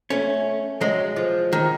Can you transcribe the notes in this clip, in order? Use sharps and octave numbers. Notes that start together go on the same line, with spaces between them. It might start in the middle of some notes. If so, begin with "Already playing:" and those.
A3 C#4
F#3 G#3
F3
D#3